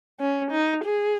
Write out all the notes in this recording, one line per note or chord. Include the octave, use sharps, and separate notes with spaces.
C#4
D#4
G#4